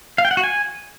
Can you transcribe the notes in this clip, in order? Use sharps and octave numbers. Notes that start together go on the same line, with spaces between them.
F5
G5
F#5
F#4
G#5